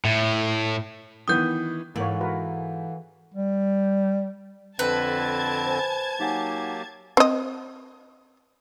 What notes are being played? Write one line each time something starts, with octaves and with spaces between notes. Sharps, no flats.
A2
D#3 E3 B3 D#6 G6
G#2 E3 A#3 A4 C#5 F5 F#5
F#4 A#4 B4
G3
F2 D3 C4 B4 A5 G#6
C5 G#5
F#3 A#3 D#4 G4 F#5 G#5
C4 D#5